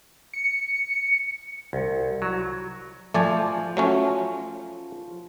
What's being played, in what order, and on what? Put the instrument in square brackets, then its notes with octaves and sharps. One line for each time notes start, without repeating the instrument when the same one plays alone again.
[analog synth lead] C#7
[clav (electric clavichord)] C2
F#3
[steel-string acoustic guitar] F3 [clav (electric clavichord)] A3 D5 G#5
[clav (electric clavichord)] F#3 A3 C#4